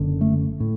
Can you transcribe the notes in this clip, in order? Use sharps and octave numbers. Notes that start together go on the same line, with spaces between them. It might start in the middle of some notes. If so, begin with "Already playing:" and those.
Already playing: F#1 F#2 D3
A3
A2